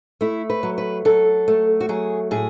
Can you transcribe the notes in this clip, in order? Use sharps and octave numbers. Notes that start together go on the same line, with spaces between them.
A3 E4
B4
F#3
B4
F#3 A4
A3
F#4
F#3 G#4
A2 G#4